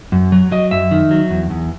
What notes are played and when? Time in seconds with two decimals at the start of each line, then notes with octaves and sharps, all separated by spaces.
0.12 F#2
0.32 F#3
0.52 F#3 D#5
0.71 F#2 E5
0.91 D#3
1.11 F#3
1.30 E2
1.50 E2